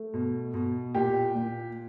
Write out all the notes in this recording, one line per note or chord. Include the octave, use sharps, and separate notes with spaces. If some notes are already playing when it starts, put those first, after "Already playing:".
Already playing: A3
B2
B2
A#2 G4
A#2